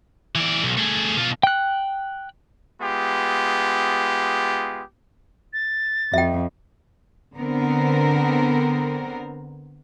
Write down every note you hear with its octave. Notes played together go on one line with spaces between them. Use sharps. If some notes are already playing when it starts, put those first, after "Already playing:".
E3 D5
B1
A3 G#4
B2 F4
G5 F#6
G#3 B3 F4 G4
A6
F2 E5 G5
D3 B3 C4 A#4